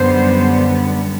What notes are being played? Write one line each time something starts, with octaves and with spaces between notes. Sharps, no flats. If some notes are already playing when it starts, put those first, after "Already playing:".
Already playing: F#2 D3 G3 B3 C5